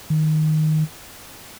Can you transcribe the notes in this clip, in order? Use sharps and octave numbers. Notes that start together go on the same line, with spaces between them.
D#3